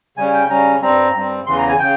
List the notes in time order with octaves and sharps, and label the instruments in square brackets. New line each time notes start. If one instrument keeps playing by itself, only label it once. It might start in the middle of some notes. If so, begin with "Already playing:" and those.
[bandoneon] C#3 G3 C#4 G#5
G5
C#3 G3 C#4 A#5
G2 G3 C4 A#5
G2 G3 C4
E2 C#3 E3 C6
A#5
G#5
C#3 G5